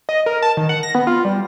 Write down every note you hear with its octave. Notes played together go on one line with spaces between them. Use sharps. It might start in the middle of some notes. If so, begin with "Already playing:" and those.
D#5
A#4
A5
D#3
F#5
A#6
B3
F4
G3